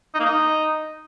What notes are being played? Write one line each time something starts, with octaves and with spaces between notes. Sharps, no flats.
D#4
A#3
D#4